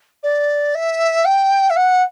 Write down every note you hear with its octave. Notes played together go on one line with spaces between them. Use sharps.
D5
E5
G5
E5
F#5